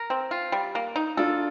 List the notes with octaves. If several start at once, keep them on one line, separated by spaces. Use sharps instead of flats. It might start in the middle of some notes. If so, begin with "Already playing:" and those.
Already playing: A#4
C4
F4
G3
A#3
D#4
D4 F4 A4